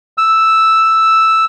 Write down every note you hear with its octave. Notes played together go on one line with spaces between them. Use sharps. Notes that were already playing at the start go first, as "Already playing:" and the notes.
E6